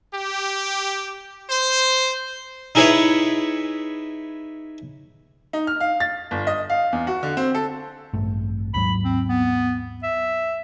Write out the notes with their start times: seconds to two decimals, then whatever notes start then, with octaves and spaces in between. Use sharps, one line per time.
0.14 G4
1.50 C5
2.75 D#4 E4 G#4 B4 C#5
5.53 D#4
5.67 F6
5.80 F5
6.00 A6
6.31 G1
6.47 D#5
6.70 F5
6.92 E2
7.07 F#4
7.23 D3
7.37 C4
7.55 A4
8.14 A1 G2 A3
8.74 D#2 G#2 F#3 B5
9.04 C4
9.29 B3
10.03 E5